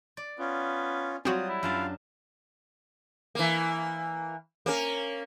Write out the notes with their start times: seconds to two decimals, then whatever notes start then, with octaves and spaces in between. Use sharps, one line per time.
0.17 D5
0.39 B3 C#4 F4
1.25 F#3 G3 C4 F4 F#4 D#6
1.49 E4
1.63 F#2 D4 F4 F5 A5
3.35 E3 A#3
4.66 A#3 C#4 A#4